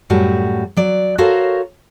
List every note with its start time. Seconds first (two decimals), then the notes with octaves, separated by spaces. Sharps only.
0.10 F#2 A2 G3 F#4
0.77 F#3 D5
1.18 F#4 A4 A#4 C5 C#5 F5